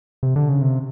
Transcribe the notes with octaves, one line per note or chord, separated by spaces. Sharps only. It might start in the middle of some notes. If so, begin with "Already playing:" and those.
C3
D3
C#3
C3